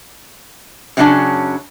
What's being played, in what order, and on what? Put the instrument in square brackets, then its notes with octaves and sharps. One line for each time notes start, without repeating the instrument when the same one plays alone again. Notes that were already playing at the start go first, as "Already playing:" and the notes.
[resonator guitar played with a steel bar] F#2 C#3 F#3 C#4 D4 A5